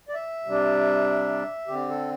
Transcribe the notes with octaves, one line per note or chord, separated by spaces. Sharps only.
D5
E5
C3 G3 D4
D3 C4 G4
A4